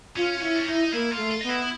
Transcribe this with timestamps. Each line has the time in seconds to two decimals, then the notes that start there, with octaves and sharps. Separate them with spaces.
0.16 C#4 F4
0.41 C#4 E4
0.55 D4
0.66 D#4 E4
0.93 A#3 E4
1.11 F4
1.17 A3
1.31 F4
1.41 B3 D#4
1.49 E4